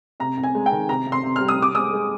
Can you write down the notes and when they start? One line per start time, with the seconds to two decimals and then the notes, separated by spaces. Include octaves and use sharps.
0.20 C3 A#5
0.37 C2
0.43 G#5
0.55 G#3
0.66 G5
0.72 D#3
0.89 C3 A#5
1.07 C3
1.12 C6
1.23 C3
1.36 G3 F6
1.48 D#6
1.58 C2 D6
1.75 G#3 D#6
1.93 G#3